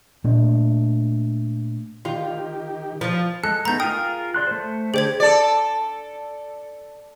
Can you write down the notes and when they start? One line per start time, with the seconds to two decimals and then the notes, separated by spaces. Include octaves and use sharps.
0.24 A#2 A3 D4
2.05 D#3 F4 G4
3.01 F3
3.44 G#3 A4 F#6
3.65 A3 B3 D#4 A#5 G6
3.80 F4 G#4 A#4 G5 D#6
4.34 D5 C6 F#6
4.47 A3 C5
4.94 D3 G4 G#4 C5 D5 G#6
5.20 A4 D5